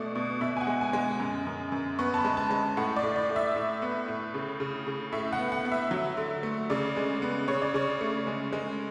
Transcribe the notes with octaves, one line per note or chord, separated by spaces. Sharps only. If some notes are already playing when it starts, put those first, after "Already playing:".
Already playing: B2 A3 D5
B2
B2 E5
G#5
F#5
G#3
G#5
G#3
F#2
F#2
F#2
B3 C#6
A5
B5
G#3
A5
G#3
A2 F#5
D5
A2
D5
A2
E5
A2
B3
A2
C#3
C#3
C#3
A2 E5
F#5
B3
F#5
B3
E5
F#3
D3
A3
C#3 D5
G#3
B3
C#3 C#5
D5
C#3 C#5
A3
G#3
G#3